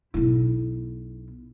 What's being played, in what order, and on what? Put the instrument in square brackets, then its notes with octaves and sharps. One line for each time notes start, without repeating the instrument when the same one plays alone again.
[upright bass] B1 E4